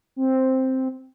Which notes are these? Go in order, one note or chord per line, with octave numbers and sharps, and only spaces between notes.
C4